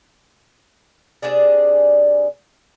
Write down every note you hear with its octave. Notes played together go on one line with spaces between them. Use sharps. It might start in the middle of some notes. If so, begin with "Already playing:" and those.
C3 D4 G#4 D5